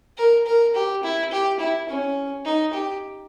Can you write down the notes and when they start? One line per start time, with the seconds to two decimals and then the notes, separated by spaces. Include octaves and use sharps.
0.18 A#4
0.46 A#4
0.75 G4
1.03 E4
1.32 G4
1.60 E4
1.88 C#4
2.45 D#4
2.73 G4